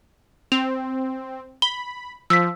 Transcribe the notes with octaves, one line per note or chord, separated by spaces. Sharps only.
C4 F7
B5 G7
F3 E6 B6